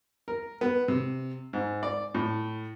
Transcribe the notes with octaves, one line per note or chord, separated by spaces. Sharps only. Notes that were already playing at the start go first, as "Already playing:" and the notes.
A#4
B3
C3
G#2
D5
A2